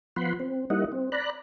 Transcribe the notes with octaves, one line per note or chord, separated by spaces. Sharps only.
F3 B3 F4 F#5 B5 C6
C4
G3 A#3 D#4 E4 D#5 F#5
C4
D5 A#5 B5 F#6